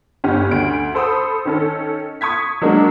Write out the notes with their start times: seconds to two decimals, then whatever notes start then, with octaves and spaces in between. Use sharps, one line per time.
0.24 G1 C#4 G4
0.51 D2 D7
0.95 A4 C5 B5 D#6 E6
1.45 D#3 C#4 A4
2.21 C#6 D#6 G#6 B6
2.62 F#3 G#3 A#3 D4